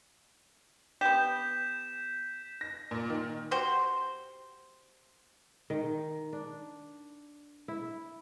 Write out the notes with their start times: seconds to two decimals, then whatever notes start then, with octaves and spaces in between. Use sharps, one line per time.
1.01 B3 G4 G6 B6 E7
2.61 A#6
2.91 A#2
3.10 D#3
3.51 F#4 G4 C5
5.70 D#3
6.33 D4
7.68 E4